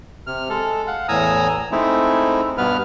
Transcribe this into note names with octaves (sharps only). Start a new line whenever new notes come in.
C3 F6
G#3 A4
F5 F#5
E2 A2 G#5 A#5 D#6 E6
G#3 A3 C4 D#4 E4
G2 B2 B3 B4 F6